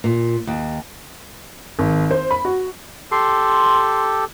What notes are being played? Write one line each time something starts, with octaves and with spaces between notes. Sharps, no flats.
A#2
D#2
G#1
C5
B5
F#4
G4 A4 C6